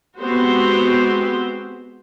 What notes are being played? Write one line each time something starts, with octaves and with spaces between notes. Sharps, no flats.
G#3 B3 C4 F#4 G4 C5